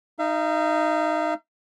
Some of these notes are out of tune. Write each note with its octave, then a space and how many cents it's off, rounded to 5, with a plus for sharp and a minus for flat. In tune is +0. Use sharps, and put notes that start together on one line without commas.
D#4 +0 F5 -45